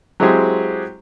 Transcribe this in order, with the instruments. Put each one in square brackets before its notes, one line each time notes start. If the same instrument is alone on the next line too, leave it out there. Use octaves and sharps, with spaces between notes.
[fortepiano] F#3 G#3 C4 E4 G4 G#4